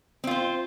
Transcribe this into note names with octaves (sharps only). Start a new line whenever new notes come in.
C4 F4 C5